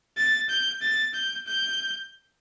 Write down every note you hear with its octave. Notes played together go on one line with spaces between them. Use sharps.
A6
G6
A6
G6
G6